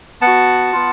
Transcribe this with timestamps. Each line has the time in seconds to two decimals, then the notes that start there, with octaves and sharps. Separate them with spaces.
0.21 B3 F#5 A5
0.27 F#4
0.73 B3 F4